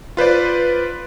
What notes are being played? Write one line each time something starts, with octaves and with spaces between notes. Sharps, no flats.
F4 B4 C5 D5